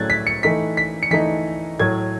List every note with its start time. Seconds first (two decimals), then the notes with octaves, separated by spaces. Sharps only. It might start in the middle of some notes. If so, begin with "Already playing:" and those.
Already playing: A2 F#3 A3 C#4 F#6 G#6 A6
0.10 B6
0.27 C#7
0.43 E3 A3 D#4 B6
0.77 B6
1.03 C#7
1.11 E3 A3 D#4 B6
1.79 A2 F#3 A3 G#6